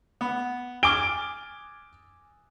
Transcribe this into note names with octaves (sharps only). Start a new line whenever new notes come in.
B3
G#5 D6 F6 D7 G7